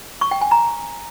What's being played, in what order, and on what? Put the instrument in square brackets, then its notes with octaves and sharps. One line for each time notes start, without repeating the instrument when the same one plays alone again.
[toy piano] C#6
G5
G#5
A#5